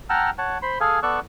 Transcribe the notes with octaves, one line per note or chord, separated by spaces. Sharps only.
F#5 G5 A5 A#5 E6 F6
C#5 F#5 A5
C5 B5 C6
G#4 A4 F5 G#5
B3 A4 D5 C#6 E6 F#6